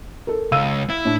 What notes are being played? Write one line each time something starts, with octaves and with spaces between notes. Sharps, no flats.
A4 A#4
C#2 F5 E6 D#7
E4
A2 D4